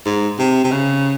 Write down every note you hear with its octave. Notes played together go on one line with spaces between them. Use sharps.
G#2
C3
C3
C#3